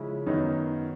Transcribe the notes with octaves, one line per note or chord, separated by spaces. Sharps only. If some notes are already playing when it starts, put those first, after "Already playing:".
Already playing: C#3 F3 G#3 C#4 E4
F#2 D#3 F#3 B3 D#4